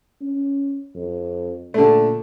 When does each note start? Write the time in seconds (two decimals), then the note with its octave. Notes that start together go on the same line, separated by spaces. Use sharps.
0.21 C#4
0.95 F2
1.74 A#2 D3 A3